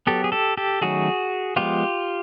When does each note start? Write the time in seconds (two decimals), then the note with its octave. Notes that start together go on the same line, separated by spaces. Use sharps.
0.07 F#3 B3 G4 A4
0.24 G#4
0.32 G4 A4
0.57 G4 A4
0.81 D#3 F#3 A3 C#4 F#4 G#4
1.56 F3 G#3 B3 F4 G4